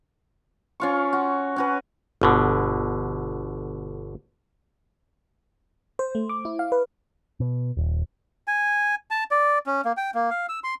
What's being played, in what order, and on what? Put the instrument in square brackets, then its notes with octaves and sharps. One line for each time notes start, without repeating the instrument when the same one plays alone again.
[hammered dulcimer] C#4 F4 C#6
F#4
C#4 F#4 B4
[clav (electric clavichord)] G1 B2 D3
[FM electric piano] C5
A3
D6
E4
F5
B4
[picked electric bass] B2
D#1
[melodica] G#5
A5
D5
C#4
A#3
G5
A#3
F5
E6
C6